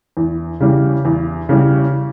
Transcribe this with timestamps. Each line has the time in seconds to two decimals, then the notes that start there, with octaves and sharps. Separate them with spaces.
0.17 E2
0.60 C#3 E3 G3
1.05 E2
1.49 C#3 E3 G3